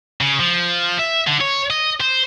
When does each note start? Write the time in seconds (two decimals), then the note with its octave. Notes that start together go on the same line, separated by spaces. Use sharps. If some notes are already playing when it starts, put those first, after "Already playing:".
0.21 C#3
0.40 F3
0.99 E5
1.27 D3
1.41 C#5
1.70 D#5
2.00 C5